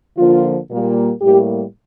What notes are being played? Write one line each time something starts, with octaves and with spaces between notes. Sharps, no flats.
D3 F3 A#3 F4
A#2 G3 A#3
A2 G3 A#3 G4